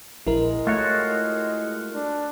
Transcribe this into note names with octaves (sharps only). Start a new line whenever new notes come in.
A#1 G#3 E4 A#4
A3 F4 F#4 C#5
D4